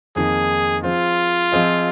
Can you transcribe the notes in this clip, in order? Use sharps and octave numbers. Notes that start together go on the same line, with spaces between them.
F2 D#3 A#3 D#4 G#4
F3 C4 F4 G#4 C5
F3 C4 G#4 C5 D#5